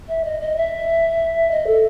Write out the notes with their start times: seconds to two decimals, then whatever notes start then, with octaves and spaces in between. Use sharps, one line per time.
0.08 E5
0.24 D#5
0.40 D#5
0.56 E5
1.51 D#5
1.66 A4